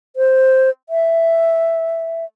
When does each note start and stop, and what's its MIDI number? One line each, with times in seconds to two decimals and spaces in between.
0.16 0.70 72
0.89 2.25 76